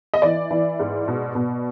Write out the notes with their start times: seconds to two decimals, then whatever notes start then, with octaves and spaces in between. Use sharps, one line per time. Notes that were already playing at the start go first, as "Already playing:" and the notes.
0.14 D#5
0.22 E3 D5
0.51 E3
0.80 G#2
1.08 B2
1.35 B2